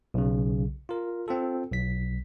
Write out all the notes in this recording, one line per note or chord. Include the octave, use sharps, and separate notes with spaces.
B1 C#3
F4 A#4
C4 F4 A4
B1 B6